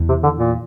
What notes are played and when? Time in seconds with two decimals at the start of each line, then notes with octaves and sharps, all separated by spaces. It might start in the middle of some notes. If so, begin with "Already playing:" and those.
Already playing: E2
0.09 C3
0.23 D3
0.38 A#2